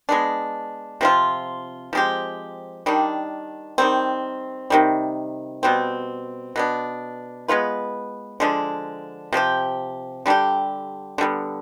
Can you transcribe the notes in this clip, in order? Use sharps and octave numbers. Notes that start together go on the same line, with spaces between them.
G#3 B3 D4
C3 F3 C4 F4
F3 G#3 C4 G4
D#3 G3 D4
D#3 G3 C4
C3 D#3 G3
B2 G3 C4
B2 B3 D4
G#3 B3 F4 B4
D3 F3 G#3 D4
C3 F3 C4 G4
D3 G3 D4 G4
D3 G3 B3